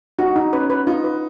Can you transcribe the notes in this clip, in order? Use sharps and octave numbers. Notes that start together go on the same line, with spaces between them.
D#4 F#4
D#4
C#4 B4
B4
D#4 F4
B4